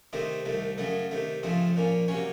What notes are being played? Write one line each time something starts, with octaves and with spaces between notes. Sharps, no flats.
C3 D#3 A3 C4 D#5
C2 C3 D#3 A3
F#2 C#3 F#3 A3 D#5
C3 D#3 A3
F2 C#3 F3 A3 C4 D#5
A#2 F3 A#3 C#4
C3 F#3 A#3 C#4 C#5